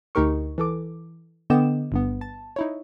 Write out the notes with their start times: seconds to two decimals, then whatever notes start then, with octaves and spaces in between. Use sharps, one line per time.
0.15 D2 D#4 G4 A#4 C#6
0.58 E3 A4 D6
1.50 D3 B3 D#5 G5 D6 E7
1.92 G1 G2 B3
2.21 A5
2.56 D#4 E4 C#5